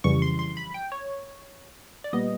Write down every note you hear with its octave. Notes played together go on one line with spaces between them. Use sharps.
F2 C#3 E3 G3 C#6
C6
C6
B5
G5
C#5
D5
A#2 G3 B3 D#5